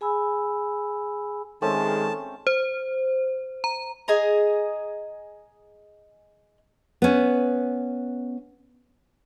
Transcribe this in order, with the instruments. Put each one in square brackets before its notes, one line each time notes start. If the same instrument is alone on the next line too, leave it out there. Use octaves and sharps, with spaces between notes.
[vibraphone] G#4 G#5 B5 E6
[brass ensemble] D#3 G#3 [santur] A3 C4 C#4 [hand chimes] A4 [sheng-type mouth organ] A5
[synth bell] C5
A#5
[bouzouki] G#4 D#5 G#5 A#5
[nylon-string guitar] B3 C#4